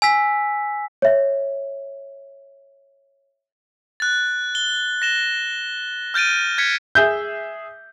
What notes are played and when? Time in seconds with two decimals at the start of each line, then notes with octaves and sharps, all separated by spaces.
0.02 G#5 E6 B6
1.02 C#5 E5
4.00 F#6 A6
4.55 G7
5.02 A#6 E7 G7
6.14 F6 G6 A6 D7 D#7
6.58 G#6 B6 C#7
6.95 G#4 E5 G6